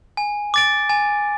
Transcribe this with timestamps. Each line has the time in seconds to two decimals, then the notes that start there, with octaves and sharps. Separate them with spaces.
0.17 G#5
0.54 D6 A6 D7
0.90 G#5